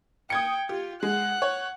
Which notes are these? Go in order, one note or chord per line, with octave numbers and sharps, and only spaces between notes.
G5 D#6 G#6 C#7
F4 G4
G#3 F#5 F#6
C#5